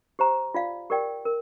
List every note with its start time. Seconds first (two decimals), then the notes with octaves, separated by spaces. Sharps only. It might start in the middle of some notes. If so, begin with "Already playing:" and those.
0.19 G4 C5 A#5
0.54 F4 D5 F5
0.90 G4 A#4 D5 G5
1.25 A#4